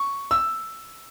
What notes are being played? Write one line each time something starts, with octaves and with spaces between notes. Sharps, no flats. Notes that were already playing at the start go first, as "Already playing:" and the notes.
Already playing: C#6
E6